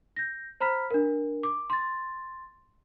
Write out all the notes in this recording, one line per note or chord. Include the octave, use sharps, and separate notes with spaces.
G6 A#6
C5 A#5 B5 F6 B6
D4 A#4
D6
C6 A6